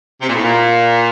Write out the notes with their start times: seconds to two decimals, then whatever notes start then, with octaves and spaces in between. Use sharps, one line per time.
0.22 C3
0.29 A#2
0.35 A2
0.43 A#2